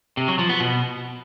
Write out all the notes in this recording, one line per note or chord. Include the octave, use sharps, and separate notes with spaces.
C3
F#3
F3
B3
B2